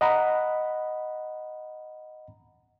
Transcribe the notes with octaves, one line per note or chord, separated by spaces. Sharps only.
D#5 F#5 A#5 B5